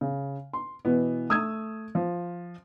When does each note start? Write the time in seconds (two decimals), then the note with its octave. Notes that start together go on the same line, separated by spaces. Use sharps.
0.01 C#3
0.53 C6
0.85 B2 E3 B3
1.29 A3 D#6 E6 G#6
1.95 F3